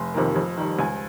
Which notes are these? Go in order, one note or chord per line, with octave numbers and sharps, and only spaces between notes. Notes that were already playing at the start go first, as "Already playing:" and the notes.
Already playing: F1 C6
F2 C3 D#3 A#3
F2
D#3 G3
C#2 G#5